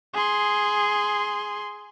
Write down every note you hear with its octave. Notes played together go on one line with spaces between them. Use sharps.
G#4 C6